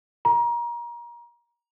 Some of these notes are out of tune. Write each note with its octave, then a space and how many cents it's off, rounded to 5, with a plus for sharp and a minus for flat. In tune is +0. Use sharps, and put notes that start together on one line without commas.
A#5 +30